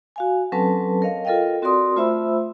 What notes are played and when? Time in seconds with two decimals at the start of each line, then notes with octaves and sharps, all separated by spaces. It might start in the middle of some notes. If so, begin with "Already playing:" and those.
0.16 F#4 F5 G#5
0.52 F#3 C4 C#4 A4 B4 A5
1.02 A#4 C#5 D#5 F5
1.25 F4 A4 A#4 D#5 F5 G5
1.62 C4 F#4 A#4 D5 C6 D#6
1.96 A3 F4 C5 E5 B5 E6